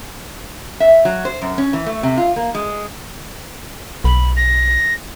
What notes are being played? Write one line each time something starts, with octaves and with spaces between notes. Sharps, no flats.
E5
F#3
C5
F#2
C#4
E3
A3
C3
F4
A#3
G#3
B1 B5
A#6